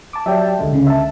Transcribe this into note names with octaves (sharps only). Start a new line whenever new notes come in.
A5 D6
F#3 G4 D5 E5 G5 A5
C#2 D3 G#3
C#3
E5 A5